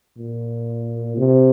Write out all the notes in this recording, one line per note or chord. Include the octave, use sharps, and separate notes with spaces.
A#2
C3